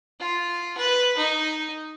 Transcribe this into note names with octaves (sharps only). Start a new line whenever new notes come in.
F4
B4
D#4